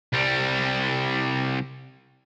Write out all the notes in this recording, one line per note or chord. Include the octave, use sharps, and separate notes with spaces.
C2 G3